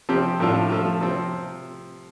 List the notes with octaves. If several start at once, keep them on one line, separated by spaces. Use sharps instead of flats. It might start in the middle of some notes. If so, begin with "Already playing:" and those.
C3 F3 C4 G4
A2 F3 A3 D4 F4
F3 A3 F4
C3 F3 C4